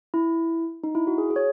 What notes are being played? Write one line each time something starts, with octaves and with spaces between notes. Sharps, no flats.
E4
D#4
E4
F#4
G#4
G#4
C#5